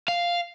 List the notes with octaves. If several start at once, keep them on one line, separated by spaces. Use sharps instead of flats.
F5